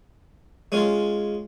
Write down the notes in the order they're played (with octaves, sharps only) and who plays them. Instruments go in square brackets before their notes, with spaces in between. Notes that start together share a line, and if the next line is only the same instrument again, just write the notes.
[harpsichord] G#3 C#4 F4